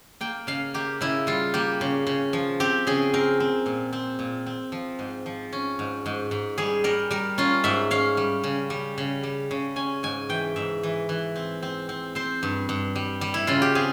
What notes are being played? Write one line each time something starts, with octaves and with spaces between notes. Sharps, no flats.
A#3 G5
C#3 F5
A#3 G4
C#3 E4
G3 F4
A#3 G4
C#3
C#3
F3
C4 G4
C#3 G#4
C4 A#4
C4
A#2
C4
A#2
C4
F3
G#2
F3
C#4
G#2
G#2
G#2
G3 G#4
G3 A#4
G3 A#4
C#4 F4
G#2 E5
C#4 F5
G3
C#3
G3
C#3
G3
C#3
C#4 G#5
G#2 G#5
E3 G5
G#2 E5
E3
E3
C4
C4
C4
C4 C5
G2
G2
G3
G3
E4
C#3 F4
G4
C4 G#4